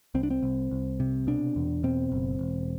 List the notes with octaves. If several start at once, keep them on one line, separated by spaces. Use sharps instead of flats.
C2 C4
D4
C4
C2
C2
C3
B2 D4
E2
B2 C4
F#1
E1